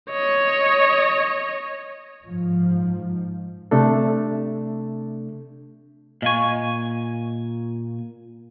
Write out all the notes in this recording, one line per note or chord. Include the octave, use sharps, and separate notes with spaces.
C#5 D#5
G#2 F3
C3 A3 D4 A4
A#2 D#5 F5 G#5 C#6